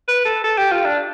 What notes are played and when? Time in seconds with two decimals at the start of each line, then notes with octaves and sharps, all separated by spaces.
0.08 B4
0.25 A4
0.44 A4
0.58 G4
0.72 F4
0.85 D4